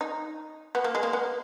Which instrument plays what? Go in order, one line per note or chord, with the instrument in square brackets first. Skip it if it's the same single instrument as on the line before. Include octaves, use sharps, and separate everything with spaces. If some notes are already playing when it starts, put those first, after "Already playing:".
[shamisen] D#4
B3
A#3
G#3
A#3
B3